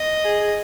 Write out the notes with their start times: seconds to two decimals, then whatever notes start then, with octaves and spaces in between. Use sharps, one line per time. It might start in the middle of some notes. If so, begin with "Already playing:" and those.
Already playing: D#5
0.24 G#4